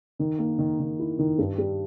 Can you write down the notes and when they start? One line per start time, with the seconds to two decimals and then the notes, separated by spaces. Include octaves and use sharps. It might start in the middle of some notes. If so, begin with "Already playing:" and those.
0.19 D#3
0.39 A#3
0.59 D#3
0.80 D#3
0.99 E4
1.19 D#3
1.38 G2
1.58 G3